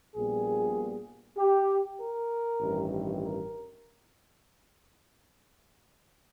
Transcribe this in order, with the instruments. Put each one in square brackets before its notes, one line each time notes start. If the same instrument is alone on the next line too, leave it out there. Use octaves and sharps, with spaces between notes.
[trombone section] A#1 A#2 G3 B3 G#4
G4
A#4
A1 G2 D#3
A#4